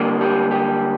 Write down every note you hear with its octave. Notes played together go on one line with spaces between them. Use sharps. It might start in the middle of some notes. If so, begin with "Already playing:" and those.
Already playing: D3 G3 A#3
G4
G4